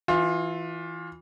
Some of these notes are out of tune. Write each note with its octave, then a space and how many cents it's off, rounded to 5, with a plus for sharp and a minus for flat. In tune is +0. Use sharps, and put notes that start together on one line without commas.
E3 +0 F4 +25